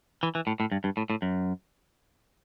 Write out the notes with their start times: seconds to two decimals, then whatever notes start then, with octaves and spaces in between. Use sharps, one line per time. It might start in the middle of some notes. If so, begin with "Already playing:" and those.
0.23 E3
0.35 E3
0.47 A2
0.60 A2
0.72 G2
0.84 G2
0.97 A2
1.10 A2
1.22 F#2